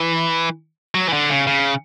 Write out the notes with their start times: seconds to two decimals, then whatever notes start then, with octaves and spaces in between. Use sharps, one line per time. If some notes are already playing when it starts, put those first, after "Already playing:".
Already playing: E3
0.95 F#3
1.08 E3
1.13 D3
1.30 C#3
1.47 C#3